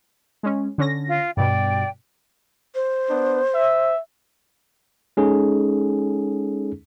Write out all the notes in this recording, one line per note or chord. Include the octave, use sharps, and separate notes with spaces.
G#3 C#4
D3 C#4 A#6
F4
G2 B2 D5 G5
C5
B3 D4
E5
G#3 C#4 D#4 G#4 A4